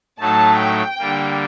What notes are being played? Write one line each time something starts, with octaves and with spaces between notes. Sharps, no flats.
A2 F#3 A3 D#4 A5
G5
D3 G3 A#3